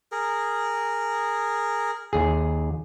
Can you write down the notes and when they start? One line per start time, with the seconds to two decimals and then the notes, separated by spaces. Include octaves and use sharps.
0.12 G#4 A#4
2.13 D#2 G#4